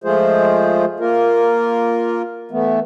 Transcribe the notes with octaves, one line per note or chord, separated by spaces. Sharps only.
F3 G#3 A3 F4 G#4 C5
A#3 F4 A#4
E3 A3 B3